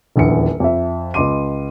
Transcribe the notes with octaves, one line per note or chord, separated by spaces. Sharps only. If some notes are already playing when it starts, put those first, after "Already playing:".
D#1 A#1 E2 C#7
F2 E5
C#2 D#5 C6 D6 D#7